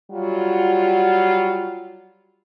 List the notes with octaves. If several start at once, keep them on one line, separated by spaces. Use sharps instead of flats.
F#3 G3 F4 F#4